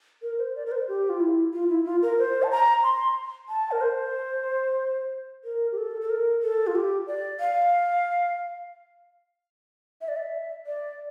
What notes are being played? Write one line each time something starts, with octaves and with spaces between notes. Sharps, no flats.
A#4
C5
D5
A#4
C5
G4
F4
E4
F4
E4
F4
A#4
C5
A5
A#5
C6
A5
A#4
C5
A#4
G4
A4
A4
A#4
A4
F4
G4
D5
F5
E5
D5
E5
D5